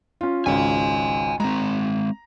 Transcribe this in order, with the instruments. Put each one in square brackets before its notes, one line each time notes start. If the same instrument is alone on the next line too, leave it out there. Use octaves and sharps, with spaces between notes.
[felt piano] C#4 F4
[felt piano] G#1 C#2 C#4 [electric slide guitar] D#5 G#5
[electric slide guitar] G#3 C4 [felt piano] A#5